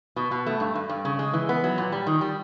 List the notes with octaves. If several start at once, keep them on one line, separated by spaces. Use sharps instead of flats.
B2
B2
A3
G2
G2
G2
C#3
G#3
E3
B3
F#3
A#2
G3
D#3
G3